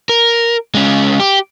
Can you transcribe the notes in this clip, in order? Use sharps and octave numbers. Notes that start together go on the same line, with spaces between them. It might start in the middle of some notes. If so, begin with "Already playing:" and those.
A#4
G#3 C#4
G4